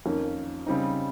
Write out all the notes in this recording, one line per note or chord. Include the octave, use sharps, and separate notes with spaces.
F2 D#3 A#3 C#4
C#3 G3 C4 D#4